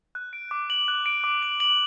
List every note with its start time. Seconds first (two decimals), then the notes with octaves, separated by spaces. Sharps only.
0.15 F#6
0.33 D7
0.51 D6
0.70 F#7
0.88 F#6
1.06 D7
1.24 D6
1.43 F#7
1.60 F#7